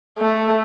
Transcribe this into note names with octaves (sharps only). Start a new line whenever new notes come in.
A3